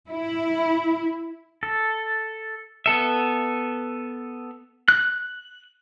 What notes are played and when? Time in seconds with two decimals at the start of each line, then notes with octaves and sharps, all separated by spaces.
0.11 E4
1.63 A4
2.86 B3 A4 E5
4.88 F#6